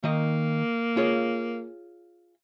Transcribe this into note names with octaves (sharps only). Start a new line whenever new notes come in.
D#3 A#3 D#5
F4 G#4 C#5